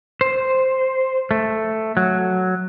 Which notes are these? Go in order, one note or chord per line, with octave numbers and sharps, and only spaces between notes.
C5
A3
F#3